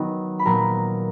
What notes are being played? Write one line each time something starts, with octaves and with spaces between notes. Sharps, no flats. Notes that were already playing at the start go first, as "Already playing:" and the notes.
Already playing: D#3 F#3 B3
B5
A#2 F#3 B3 A#4 A#5